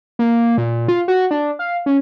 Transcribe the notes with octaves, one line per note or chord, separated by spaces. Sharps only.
A#3
A#2
F4
F#4
D4
F5
C#4